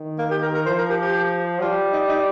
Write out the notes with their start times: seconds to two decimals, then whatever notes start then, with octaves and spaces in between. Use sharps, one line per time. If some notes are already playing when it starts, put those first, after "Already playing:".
Already playing: D#3
0.19 A#3
0.31 G4
0.42 A#4
0.54 A#4
0.66 F3 C5
0.78 A#4
0.90 G4
1.02 G4
1.61 G3 F4
1.93 D#4
2.09 D#4